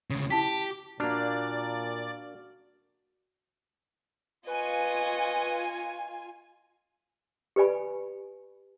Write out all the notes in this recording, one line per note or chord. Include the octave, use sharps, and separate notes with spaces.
D2 C#3
E4 G4 A5 B6
A#2 A#3 D4 F#4 D5 F6 A6
F4 B4 D#5 G#5 C#6
G4 B4 D5 G#5 B5